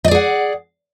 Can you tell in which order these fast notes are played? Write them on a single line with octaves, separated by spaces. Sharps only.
D#5 D5 G#4 F#5